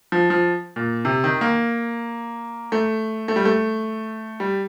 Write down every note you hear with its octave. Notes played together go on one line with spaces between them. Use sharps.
F3
F3
A#2
C3
D#3
A#3
A3
A3
G3
A3
G3